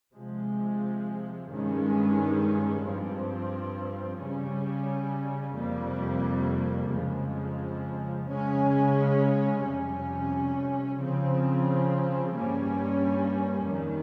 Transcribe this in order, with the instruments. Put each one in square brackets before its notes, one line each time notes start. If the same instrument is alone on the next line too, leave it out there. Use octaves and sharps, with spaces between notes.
[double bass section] C3 F3 G#3
G2 D#3 G#3 C#4
G2 F3 C4
C#3 G3 C#4
F2 C3 G3 A#3
F2 C#3 F3 G#3
C#3 G#3 C#4
F2 C3 G3 C#4
C#3 F3 C4
G2 G3 A#3 C#4
F2 D#3 G3